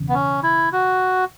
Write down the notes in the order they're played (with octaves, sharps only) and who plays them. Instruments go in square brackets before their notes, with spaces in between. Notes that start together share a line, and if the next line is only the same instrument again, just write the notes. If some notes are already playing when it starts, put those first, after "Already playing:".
Already playing: [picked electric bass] E1 E2 C#3
[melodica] B3
C#4
E4
F#4